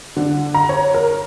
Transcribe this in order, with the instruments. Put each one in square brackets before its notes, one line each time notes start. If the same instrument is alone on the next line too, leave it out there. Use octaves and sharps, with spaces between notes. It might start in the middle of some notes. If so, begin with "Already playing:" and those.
[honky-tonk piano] D3
A#5
C#5
A#4